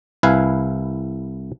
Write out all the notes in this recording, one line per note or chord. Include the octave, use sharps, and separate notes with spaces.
C2 E4 B4 F5 G#5